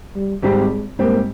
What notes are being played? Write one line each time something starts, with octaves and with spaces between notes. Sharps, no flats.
G3
G#1 G#2 G3 G#3 C4 G4
G#2 G3 A#3 C4 G4